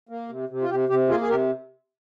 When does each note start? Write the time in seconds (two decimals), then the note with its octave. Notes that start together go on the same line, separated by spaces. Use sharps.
0.09 A#3
0.29 C3
0.49 C3
0.62 F4
0.69 C3 G4
0.89 C3 G4
1.09 A#3 F4 G#4
1.21 G#4
1.29 C3 G4 A#4